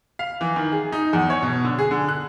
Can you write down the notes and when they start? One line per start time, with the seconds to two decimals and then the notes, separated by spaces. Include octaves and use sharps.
0.19 F5
0.41 E3
0.56 D#3
0.72 G#4
0.92 D#4
1.13 E2
1.30 C#5
1.42 B2
1.65 D3
1.78 G#4
1.91 D3
2.09 F#6